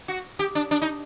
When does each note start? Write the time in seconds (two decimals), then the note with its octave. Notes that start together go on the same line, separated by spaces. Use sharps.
0.08 F#4
0.39 G4
0.55 D4
0.71 D4
0.82 D#4